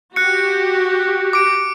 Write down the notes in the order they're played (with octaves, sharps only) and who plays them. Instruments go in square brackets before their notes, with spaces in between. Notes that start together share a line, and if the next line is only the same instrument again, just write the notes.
[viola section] F#4 G4 [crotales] F#6 C#7
[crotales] D6 D7